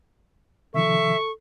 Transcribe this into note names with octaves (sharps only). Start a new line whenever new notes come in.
C3 D#3 F3 A4 E5 C#6